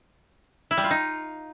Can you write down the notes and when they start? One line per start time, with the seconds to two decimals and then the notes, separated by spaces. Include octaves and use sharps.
0.71 E4
0.77 G3
0.84 F4
0.91 D#4